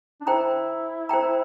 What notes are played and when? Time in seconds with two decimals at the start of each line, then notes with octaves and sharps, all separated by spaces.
0.21 D4
0.27 E4 C5 G5 A#5
1.09 C5 G5 A#5